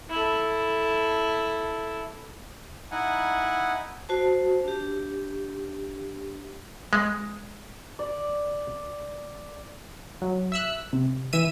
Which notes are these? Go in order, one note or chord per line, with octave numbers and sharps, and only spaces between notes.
E4 A4
D#4 E4 F#5 G#5
F#4 C5 A5
D4 G4
G#3
D5
F#3
E5 E6 F#6
C3
E3 E5 E6 D#7